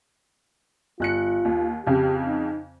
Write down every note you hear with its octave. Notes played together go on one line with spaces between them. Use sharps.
G1 F4 F#6 C#7
D#2
F2 C#3 G4
D#4